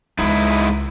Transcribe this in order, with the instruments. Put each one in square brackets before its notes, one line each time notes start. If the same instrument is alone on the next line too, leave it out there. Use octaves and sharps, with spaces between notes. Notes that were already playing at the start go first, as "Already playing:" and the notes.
[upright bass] C#2 E3 [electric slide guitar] G#2 D#4 E4